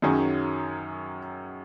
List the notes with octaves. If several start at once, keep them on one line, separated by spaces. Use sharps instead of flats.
F#2 D#3 F#3 C#4 G#4